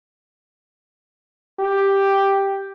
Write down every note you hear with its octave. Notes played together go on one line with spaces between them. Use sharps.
G4